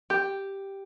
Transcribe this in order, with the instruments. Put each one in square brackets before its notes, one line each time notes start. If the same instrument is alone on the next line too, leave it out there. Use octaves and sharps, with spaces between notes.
[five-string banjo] G4